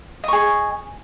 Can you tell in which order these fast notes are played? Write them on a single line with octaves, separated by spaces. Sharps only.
D#5 C#6 G#4